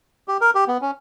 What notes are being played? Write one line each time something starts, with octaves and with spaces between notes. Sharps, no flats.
G4
A#4
G4
B3
C#4